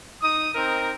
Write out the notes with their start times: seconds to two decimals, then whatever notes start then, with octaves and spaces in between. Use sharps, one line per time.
0.21 D#4 D#6
0.55 C4 D#4 A#4